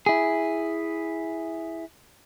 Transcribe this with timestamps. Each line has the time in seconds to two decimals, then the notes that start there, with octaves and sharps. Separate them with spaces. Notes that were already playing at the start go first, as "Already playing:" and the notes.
0.06 E4 G#4